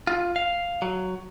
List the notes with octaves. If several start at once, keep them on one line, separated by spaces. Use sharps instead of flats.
F4
F5
F#3